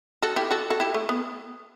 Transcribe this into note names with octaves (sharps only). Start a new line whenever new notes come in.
F#4 A4
E4 G4
F#4 A4
F#4 A4
E4 G4
A3
B3